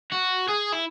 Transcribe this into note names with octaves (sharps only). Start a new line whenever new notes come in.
F#4
G#4
E4